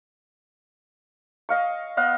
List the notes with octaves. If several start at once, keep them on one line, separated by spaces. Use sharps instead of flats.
D#5 F5 C#6
B3 D#5 F5 F#5